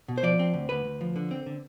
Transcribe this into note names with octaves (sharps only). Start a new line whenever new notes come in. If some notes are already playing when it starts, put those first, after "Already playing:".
B2
C5
F3 D5
C4
D2
D2 B4
D2
F3
D3
C4
D3